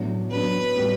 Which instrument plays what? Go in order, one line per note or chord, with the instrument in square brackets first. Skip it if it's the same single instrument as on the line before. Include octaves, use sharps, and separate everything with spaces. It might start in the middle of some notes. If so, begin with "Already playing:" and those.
Already playing: [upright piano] A2 F#3 B3 D4
[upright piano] F#3 B3 D4 [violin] B4
[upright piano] A2 G3 B3